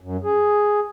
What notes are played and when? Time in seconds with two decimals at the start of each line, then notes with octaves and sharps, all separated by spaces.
0.01 F#2
0.24 G#4